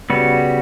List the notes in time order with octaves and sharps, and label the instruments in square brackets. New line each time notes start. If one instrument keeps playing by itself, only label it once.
[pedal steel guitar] C#3 G3 B3 F#4